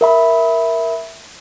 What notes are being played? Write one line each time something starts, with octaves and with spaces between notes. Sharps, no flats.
A#4 E5 B5